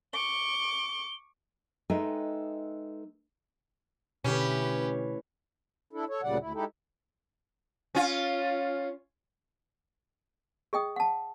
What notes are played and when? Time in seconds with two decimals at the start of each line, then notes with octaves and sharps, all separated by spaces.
0.13 C#6 D6 G7
1.90 G#3 D#4 A4 B4 E5 G5
4.24 B2 D3 E3 A3 C#4 G4 B4
5.93 D4 E4 A4
6.09 A4 C#5
6.23 D2 A#2 C#3 G3 D5 F#5
6.39 D2 E4
6.54 G#3 D#4 E4 G4 A4
7.95 C#4 F4
10.73 G#4 D#5 G5 D#6
10.96 F#5 A5